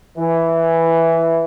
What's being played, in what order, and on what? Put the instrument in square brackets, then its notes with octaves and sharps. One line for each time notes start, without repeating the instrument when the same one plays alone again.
[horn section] E3